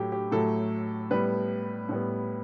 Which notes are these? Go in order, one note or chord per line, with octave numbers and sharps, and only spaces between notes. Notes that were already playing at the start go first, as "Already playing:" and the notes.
Already playing: A2 F#3 A3 G4
G4
A2 F#3 A3 A4
A2 G3 B3 B4
A2 G3 B3